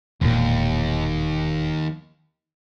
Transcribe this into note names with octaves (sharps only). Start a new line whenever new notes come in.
E1 D#2 A#2